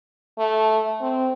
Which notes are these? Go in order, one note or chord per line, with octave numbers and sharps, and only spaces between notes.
A3
C4